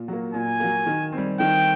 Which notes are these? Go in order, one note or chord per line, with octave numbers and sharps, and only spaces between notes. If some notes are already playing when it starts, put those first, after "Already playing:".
Already playing: A#2
F#3 A#3
A#2 G#5
F#3 A#3
D#3
C4
G3
D#3 G5